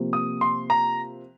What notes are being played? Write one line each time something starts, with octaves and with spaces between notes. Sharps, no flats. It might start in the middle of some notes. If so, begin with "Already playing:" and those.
Already playing: C3 F3 A#3
D#6
C6
A#5